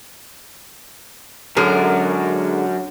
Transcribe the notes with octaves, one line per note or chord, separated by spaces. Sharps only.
F#2 D3 G#3 A#4